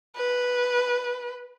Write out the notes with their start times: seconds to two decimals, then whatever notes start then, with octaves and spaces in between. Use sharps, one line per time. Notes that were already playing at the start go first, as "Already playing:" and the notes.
0.16 B4